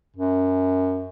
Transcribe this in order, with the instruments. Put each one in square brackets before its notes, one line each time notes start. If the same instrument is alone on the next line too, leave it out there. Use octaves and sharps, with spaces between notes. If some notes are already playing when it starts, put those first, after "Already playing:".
[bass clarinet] F#2